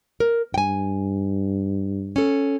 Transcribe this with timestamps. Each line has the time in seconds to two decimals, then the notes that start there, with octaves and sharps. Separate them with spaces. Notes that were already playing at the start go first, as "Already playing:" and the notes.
0.20 A#4
0.54 G2 G5 G#5
2.16 C#4 A4